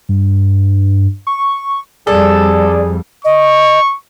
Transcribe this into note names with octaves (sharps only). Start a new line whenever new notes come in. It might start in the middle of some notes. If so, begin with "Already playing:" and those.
G2
C#6
F2 G3 G#4 A4 D5
D#5 C#6